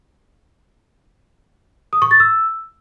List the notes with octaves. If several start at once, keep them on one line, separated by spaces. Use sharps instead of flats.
D#6
C#6
A6
E6